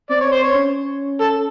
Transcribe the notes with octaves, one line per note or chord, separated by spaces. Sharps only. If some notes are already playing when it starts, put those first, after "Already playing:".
C4 D5
C#5
C5
C#5
C#4
A4